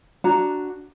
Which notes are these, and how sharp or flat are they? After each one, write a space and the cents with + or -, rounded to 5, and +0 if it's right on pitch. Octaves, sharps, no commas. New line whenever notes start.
D4 +0 F#4 +0 A#5 +0